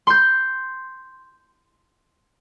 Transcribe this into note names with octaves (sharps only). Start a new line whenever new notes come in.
C6 G6